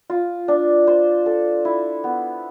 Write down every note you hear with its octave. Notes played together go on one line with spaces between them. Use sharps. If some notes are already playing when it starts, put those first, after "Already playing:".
F4
D4
C5
A4
E4
B3